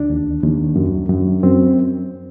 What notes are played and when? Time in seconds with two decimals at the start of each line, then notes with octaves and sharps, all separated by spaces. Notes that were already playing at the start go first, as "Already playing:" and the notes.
Already playing: D2 D4
0.10 D#2
0.43 D#2
0.76 F#2
1.09 F#2
1.43 F#2 C4